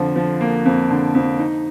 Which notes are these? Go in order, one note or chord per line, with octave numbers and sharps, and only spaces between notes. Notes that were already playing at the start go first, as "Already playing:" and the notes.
Already playing: F2 D3 F3
F3
A#3
F2
D3
F2
D#4